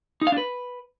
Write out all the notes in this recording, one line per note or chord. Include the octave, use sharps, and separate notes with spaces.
D#4
F5
D4
B4